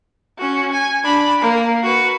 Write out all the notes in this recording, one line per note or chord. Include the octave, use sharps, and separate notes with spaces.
C#4 F#4
G#5
D4 B5
A#3
F#4 B4